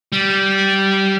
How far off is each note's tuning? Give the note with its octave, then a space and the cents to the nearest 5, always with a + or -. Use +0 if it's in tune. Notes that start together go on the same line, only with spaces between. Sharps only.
G3 -15